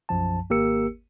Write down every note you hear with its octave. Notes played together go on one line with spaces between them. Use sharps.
B1 F#2 F3 A5
G#1 A#3 G4 A#4 E6 C#7